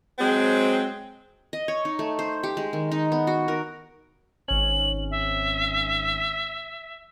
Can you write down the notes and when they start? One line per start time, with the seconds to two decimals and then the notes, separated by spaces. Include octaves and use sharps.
0.19 F#3 G#3 C4
1.53 D#5
1.68 C#5
1.85 D#4
1.99 A3
2.19 C5
2.43 G4
2.57 G#3
2.73 D#3
2.92 D#4
3.12 B3
3.27 F#4
3.48 A#4
4.48 G#1 C#4 F#7
5.11 E5